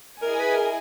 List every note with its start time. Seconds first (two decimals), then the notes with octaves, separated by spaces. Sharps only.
0.21 E4 G#4 A#4 D#5 G#5
0.39 B4
0.55 A#4